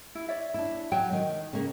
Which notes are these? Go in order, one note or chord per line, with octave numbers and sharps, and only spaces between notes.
E4
C#5 D5 E5
D4 E4
F#3 G5
D#3
C#3 A#3